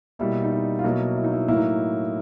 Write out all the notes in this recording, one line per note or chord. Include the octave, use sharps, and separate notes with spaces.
B2 G3 A#3 E4
D#4
E4
F4
B2 F#3 A#3 E4
E4
D#4
E4
A2 F#3 A#3 E4
D#4